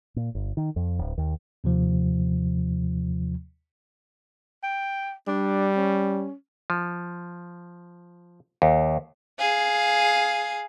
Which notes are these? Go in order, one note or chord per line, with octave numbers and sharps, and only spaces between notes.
A#2
G1
D#3
F2
D1
D#2
D#2 C3 F3
G5
G3 D4
C#4
F3
D#2
G#4 F5